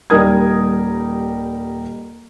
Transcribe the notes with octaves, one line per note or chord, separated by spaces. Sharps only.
D#1 G3 D#4 A#4 D#6 G#6